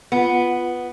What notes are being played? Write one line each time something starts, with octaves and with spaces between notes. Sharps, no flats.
B3 F4